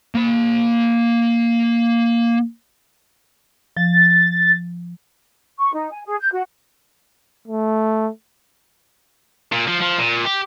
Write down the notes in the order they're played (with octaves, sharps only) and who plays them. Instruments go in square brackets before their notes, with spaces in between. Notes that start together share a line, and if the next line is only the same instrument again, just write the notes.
[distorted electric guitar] A#3 B5
[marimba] F3 [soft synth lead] A6
[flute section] C#6
D#4
G#5
G#4
G6
F#4
[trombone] A3
[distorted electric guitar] A#2
F3
F3
A#2
G4